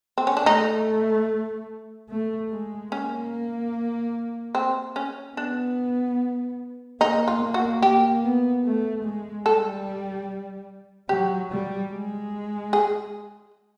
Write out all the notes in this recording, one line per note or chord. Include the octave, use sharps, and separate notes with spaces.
C4
C#4
D4
A3 D#4
A3
G#3
A#3 C#4
C4
C#4
B3 D4
A#3 D#4
F4
A#3
F#4
A#3 G4
B3
A3
G#3
G3 A4
F#3 G4
G3
G#3
G#4